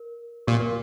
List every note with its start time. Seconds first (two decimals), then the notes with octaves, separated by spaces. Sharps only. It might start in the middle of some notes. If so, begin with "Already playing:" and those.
Already playing: A#4
0.47 A#2 G4
0.60 A#4